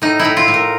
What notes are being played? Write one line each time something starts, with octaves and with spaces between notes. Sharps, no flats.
A2 D#4
E4
A2
F4
A2
A#4